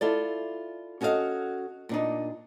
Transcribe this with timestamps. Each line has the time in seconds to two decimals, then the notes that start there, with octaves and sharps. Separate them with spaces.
0.01 E4 F4 A4 D5
1.01 C#4 F#4 A4 D#5 F5
1.89 A#2 D4 D#4